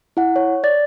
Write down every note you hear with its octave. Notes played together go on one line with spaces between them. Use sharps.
E4 F#5
C#5
D5 A6